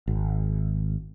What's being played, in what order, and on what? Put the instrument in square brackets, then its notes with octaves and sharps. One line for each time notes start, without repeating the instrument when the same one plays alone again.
[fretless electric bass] G#1